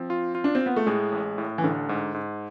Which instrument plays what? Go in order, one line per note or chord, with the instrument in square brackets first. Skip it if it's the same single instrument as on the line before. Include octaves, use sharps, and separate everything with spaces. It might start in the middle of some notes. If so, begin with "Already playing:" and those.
Already playing: [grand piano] F3 [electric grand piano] C4
[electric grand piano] F4
F4
[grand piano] D4
C4
[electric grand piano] F4
[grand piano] B3
A3
[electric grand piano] A2 [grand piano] G#3
[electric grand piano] A1
A2
[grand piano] E3
[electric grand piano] A1 [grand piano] D3
[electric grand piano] G#2
G#2